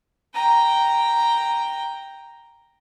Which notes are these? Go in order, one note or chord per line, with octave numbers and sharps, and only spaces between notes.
G5 A#5